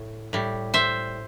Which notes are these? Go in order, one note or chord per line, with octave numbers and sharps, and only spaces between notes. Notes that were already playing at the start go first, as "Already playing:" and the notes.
Already playing: A2
A2 G3
C5 E5